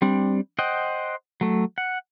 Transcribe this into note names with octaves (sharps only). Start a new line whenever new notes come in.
G3 C4 D4
C5 D#5 F#5 G5
F#3 A3
F#5